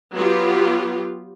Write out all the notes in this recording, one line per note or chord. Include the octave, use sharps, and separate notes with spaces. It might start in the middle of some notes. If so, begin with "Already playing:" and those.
F#3 B3 F4 G4